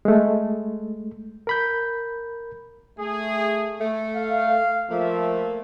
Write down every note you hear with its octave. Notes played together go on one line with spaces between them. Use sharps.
G#3 A3
A#4 B5 G6
A3 G#4
A3
F5
F3 A3 A#3 E5